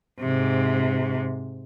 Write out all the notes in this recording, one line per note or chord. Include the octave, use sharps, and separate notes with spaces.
G#2 C3